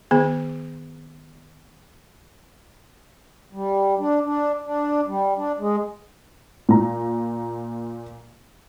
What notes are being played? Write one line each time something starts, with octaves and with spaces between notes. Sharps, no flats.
D#3 B3 G#4
G3
D4
D4
D4
G3
D4
G#3
A#2 A#5